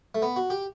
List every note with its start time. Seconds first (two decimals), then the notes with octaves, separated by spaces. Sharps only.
0.15 A3
0.22 B3
0.36 F#4
0.50 G4